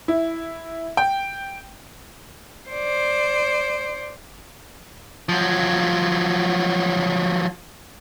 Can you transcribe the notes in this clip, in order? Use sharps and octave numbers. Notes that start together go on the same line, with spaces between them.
E4
G5
C5 D5
F3 F#3